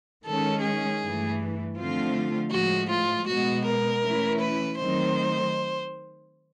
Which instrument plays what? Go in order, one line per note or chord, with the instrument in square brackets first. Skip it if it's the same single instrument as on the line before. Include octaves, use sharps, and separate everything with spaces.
[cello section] D#3 G#3 C#4 [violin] A4
[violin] G#4
[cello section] G2 E3 A3
D3 F3 A3 C4 F4
[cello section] A2 F3 G#3 [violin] F#4
[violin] F4
[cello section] B2 G#3 B3 [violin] F#4
[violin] A#4
[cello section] E3 A3 C#4 E4
[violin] B4
[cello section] D#3 F#3 A3 C4 D#4 [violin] C5